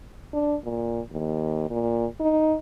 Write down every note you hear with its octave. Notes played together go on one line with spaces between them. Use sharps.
D4
A#2
D#2
A#2
D#4